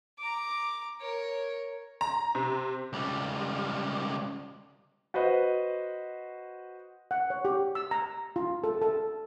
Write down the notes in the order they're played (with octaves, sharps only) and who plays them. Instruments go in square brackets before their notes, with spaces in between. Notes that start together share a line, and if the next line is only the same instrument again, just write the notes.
[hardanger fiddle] A#5 D6
A#4 C#5
[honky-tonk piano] A#5
C3
[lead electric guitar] C#2 G3
[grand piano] F#4 B4 C5 D#5
[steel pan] F#5
C#5
G4
E6
A#5
F4
A4
A4